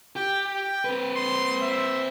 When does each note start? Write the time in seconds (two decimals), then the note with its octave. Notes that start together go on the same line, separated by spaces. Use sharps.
0.16 G4 G5
0.46 G5
0.85 C4 B4
1.16 C6
1.63 E5